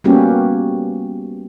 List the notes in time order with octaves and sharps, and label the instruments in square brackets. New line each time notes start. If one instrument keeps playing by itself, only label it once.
[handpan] G3 A#3 B3 C#4 F#4 G4